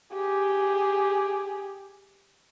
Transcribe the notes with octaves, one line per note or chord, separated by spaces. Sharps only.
G4 G#4